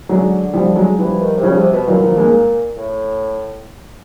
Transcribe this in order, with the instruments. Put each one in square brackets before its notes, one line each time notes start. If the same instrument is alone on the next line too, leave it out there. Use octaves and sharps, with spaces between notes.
[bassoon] D3 [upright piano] F#3 G#3
[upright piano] F3 G3
F#3 G#3
[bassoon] E3 [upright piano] F3 G3
[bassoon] D#3
C3
[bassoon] C#3 [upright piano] F3 G3
[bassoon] C3
B2
[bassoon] A#2 [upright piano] E3 F#3
[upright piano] D#3 F3
G#3 A#3
[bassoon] A2